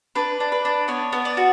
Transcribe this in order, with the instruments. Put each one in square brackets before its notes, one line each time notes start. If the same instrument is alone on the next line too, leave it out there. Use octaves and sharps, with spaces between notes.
[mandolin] D4 B4
D4
B4
D4
B3 C#5
B3
D5
F#4